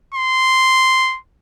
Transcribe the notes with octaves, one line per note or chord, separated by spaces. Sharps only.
C6